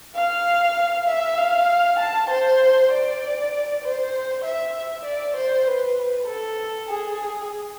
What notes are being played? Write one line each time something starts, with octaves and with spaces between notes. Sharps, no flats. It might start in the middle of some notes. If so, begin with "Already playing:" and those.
F5
E5
F5
A5
C5
D5
C5
E5
D5
C5
B4
A4
G#4